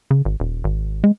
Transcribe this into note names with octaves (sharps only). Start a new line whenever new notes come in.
C#3
G#1
D#1
G#1
G#3